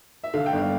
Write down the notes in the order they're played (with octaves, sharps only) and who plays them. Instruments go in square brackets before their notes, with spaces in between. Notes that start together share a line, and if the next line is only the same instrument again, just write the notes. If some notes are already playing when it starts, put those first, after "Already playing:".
[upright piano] E5
D3 F5
G5
G1
F5